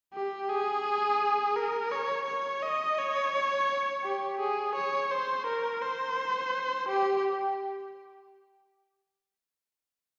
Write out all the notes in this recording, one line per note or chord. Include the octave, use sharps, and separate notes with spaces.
G4
G#4
A#4
C#5
C#5
D#5
C#5
G4
G#4
C#5
C5
A#4
C5
G4